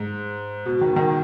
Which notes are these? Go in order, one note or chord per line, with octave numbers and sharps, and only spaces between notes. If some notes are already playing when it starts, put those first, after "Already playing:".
Already playing: G#2
B2
D#3
D#3